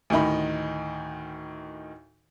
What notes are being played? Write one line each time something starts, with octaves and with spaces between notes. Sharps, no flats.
D2 A2 D#3 D#4 B5